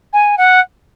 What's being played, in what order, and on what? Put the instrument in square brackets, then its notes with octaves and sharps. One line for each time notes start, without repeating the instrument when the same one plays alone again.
[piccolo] G#5
F#5